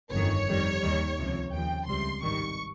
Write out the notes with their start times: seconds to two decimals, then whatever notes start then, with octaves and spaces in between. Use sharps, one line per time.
0.11 G1 F2 D#3 C#5
0.47 F2 D#3 G3
0.82 D#2 D#3 G3
1.17 C#2 C3 F3
1.52 D#2 C#3 F3 G5
1.87 C#2 C3 G3 C6
2.22 G#1 G2 D#3 G3 C#6